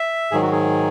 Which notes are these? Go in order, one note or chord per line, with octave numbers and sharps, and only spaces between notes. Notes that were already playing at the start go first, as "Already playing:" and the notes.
Already playing: E5
G#2 D#3 F#3 G#4
F#4
G#4